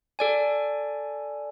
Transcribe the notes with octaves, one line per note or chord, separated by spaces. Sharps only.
A4 D5 G#5